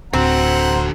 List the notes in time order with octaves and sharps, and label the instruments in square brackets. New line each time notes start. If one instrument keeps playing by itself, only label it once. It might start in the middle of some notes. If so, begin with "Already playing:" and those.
[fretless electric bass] D1 [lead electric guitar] D3 F#4 [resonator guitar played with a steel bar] C4 [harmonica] C5 F#5 A#5